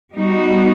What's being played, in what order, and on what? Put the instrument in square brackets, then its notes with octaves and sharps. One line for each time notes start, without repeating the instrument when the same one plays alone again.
[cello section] G3 B3 D#4 F#4